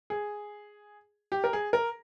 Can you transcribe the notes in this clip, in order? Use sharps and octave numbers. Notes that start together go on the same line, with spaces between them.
G#4
G4
A#4
G#4
A#4